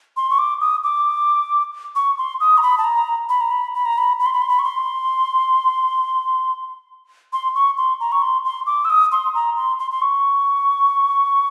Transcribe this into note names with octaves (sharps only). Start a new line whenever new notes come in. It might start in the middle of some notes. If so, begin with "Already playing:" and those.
C6
C#6
D6
D#6
D6
C#6
C6
D#6
A#5
B5
A5
A#5
B5
A#5
B5
B5
A#5
B5
B5
C6
B5
C6
B5
C#6
C6
C6
C#6
C6
A#5
C#6
C6
C6
D6
E6
D#6
C6
A#5
C6
C6
C6
C#6